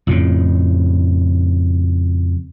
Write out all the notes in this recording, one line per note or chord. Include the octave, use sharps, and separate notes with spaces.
F2 A2 C#3